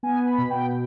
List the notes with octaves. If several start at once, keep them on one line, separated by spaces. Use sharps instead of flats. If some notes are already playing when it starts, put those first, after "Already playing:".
B3 G#5
B5
B2
G5